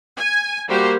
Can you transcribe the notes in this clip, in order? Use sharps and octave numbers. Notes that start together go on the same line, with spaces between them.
G#5
G3 A#3 F#4 G4 C5